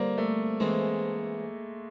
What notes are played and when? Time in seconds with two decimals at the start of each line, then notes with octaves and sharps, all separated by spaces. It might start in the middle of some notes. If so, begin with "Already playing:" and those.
Already playing: D3 G3 A#3 C4
0.18 A3
0.60 G#2 E3 G#3 A3 C4